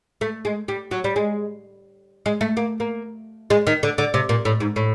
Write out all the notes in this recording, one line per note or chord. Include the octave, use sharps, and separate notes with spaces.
A3
G#3
G3
F#3
G3
G#3
G#3
A3
A#3
A#3
G#3
D#3
D3
D3
C3
A#2
A2
G#2
A2